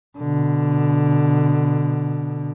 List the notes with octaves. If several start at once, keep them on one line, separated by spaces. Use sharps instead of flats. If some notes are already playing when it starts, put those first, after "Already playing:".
B2 D3